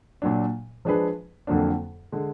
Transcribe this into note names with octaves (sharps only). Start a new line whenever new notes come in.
A#2 F#3 D4
F3 G#3 D4 G#4 B4
F2 D3 F#3 A#3 D4
D3 G#3